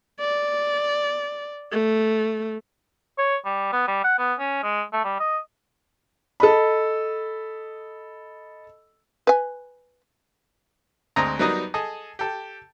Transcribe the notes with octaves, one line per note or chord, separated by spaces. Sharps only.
D5
A3
C#5
G3
B3
G3
F#5
B3
C#4
G#3
A3
G3
D#5
A4 D#5 B5
B4 G#5
D2 G#3 C4 D#5 A#5
F#3 G3 B3 D#4 A#4 D#5
G#4 A4 D#5
G4 A4